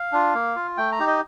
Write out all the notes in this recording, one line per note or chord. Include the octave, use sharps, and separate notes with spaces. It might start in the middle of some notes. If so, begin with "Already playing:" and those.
Already playing: F5
D4 F4
A#3
F4
A3 G5
A#5
D#4 G4
D#5